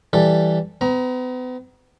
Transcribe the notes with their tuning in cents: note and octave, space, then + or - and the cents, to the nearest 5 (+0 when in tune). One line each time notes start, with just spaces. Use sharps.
E3 +0 G3 +0 A4 +0
B3 +40 A#5 +25